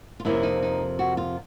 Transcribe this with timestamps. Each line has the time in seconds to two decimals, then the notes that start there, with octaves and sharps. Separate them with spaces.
0.20 F4
0.25 F2 C3 F3 A#3 C#4 E4
0.43 D#4
0.62 D#4
0.99 F#4
1.17 F4